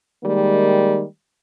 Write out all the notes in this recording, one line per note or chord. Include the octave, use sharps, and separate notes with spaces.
D#3 G3 G#3 A#3